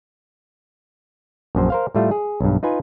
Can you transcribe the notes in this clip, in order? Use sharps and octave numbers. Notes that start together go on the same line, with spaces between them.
A#1 F#2 C5
A#4 C5 F5
A2 G3 A3 F4
G#4
B1 G2
D#4 F4 B4 G#5